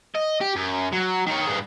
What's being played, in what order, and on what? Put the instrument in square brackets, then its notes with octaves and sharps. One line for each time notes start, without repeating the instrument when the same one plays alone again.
[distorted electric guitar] D#5
G4
F#2
F#3
D#3 C#5
G2 G#4